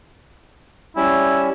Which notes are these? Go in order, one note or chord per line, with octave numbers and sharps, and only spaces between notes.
G3 C#4 E4